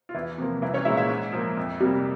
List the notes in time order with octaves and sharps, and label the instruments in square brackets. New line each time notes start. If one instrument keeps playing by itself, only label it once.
[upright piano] F4
E2 E3 E4
C3 F3 A#3
C2 E3 E4
C#4 C#5
G#3 E4 E5
A#2
E4 E5
G#2
F3 A#3
F2
C3 G3 A#3